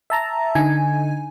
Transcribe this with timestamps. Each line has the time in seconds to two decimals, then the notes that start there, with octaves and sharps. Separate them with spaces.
0.10 E5 A5 A#5
0.55 D3 D#4 G#5